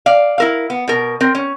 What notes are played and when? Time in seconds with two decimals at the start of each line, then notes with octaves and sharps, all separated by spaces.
0.06 D5 F5
0.38 E4 A#4 F5
0.70 B3
0.88 B2 A#4
1.20 C4 A#4
1.35 C#4